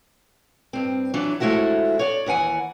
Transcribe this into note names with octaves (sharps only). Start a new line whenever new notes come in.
G2 C4
E3 F#3 D4
F3 G#3 A3 E4 F#4 E5
C#5 D5
D#2 E3 F#5 G#5